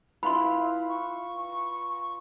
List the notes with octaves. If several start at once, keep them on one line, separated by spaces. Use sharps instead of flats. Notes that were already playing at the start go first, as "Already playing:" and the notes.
E4 F4 B4 B5 C6
C#6